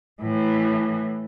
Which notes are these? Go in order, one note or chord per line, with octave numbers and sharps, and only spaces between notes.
A2 E3